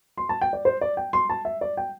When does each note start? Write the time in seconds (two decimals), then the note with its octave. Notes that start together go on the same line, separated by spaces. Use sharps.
0.17 C6
0.29 A5
0.41 G5
0.53 D5
0.65 C5
0.81 D5
0.97 G5
1.13 C6
1.30 A5
1.45 E5
1.61 D5
1.77 G5